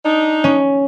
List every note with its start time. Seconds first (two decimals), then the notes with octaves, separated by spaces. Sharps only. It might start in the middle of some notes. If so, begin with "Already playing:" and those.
0.05 D4 D#4
0.44 C#4